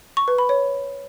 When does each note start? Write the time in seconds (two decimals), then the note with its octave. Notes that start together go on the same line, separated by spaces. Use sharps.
0.17 C#6
0.28 B4
0.38 B5
0.49 C#5